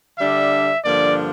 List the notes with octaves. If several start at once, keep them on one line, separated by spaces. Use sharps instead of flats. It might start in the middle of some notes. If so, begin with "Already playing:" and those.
D3 G3 D4 E5
G2 D3 F3 A#3 D4 D5